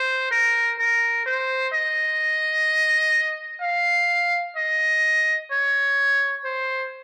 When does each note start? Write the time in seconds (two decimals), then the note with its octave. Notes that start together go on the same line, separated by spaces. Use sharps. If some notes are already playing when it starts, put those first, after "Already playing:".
Already playing: C5
0.31 A#4
0.79 A#4
1.26 C5
1.73 D#5
3.62 F5
4.57 D#5
5.52 C#5
6.45 C5